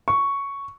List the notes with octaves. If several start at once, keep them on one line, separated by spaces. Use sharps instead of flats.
C#6